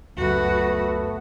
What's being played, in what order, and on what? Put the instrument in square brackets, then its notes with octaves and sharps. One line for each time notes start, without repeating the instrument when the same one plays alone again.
[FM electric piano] C#2 F#2 [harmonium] A3 B3 [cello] F#4 B4